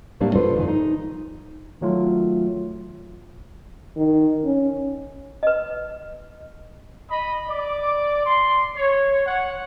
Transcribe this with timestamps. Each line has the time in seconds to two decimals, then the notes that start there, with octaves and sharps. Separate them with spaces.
0.20 A2 C3 G3 A#3 D4
0.36 F4 A4 B4 C5 D5
0.56 F2 D#3 G#5
0.68 D#4
1.81 D#3 F#3 A3 F4
3.97 D#3
4.45 C#4
5.43 B4 D#5
7.09 D#5 B5
7.48 D5 D6
8.25 C6
8.76 C#5
9.26 C#5 F#5